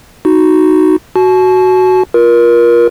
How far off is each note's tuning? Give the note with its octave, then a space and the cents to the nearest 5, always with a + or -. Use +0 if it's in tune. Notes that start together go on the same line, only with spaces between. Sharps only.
D#4 +0 F#4 +0
F#4 +5 A5 -35
F4 +0 A#4 +30